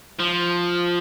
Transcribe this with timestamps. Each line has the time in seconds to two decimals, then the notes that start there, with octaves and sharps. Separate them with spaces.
0.20 F3